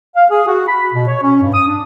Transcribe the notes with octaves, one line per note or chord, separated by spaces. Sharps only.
F5
G#4
F#4
B5
B2
C#5
C#4
G2
D#6
D4